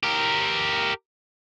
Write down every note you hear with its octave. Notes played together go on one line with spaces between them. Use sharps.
G4 A#4